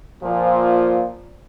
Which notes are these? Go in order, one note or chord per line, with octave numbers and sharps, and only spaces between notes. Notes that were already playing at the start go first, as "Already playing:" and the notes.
A#2 F3